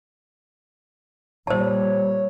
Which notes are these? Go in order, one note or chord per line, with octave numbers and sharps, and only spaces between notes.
A#2 G3 C5 C#5 A5